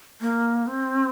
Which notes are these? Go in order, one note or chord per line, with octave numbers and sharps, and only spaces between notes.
A#3
C4